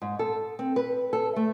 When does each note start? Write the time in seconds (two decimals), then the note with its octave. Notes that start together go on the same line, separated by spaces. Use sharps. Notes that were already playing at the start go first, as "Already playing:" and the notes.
0.02 G#2
0.19 A4
0.59 C4
0.76 B4
1.13 A4
1.36 A3